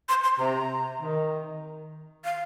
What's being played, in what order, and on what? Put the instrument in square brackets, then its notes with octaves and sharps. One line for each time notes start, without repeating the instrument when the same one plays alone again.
[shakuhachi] C6
C6
[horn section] C3 [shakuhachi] A#5
[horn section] D#3
[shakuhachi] F5